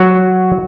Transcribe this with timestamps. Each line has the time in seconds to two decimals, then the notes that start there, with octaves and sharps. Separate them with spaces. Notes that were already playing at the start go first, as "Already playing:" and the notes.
Already playing: F#3 F#4